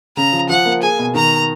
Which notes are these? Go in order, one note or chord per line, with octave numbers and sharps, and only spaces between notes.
C#3 A#5
F3
F3 F#5
A#3
G#4 G#5
B2
D#3 A#5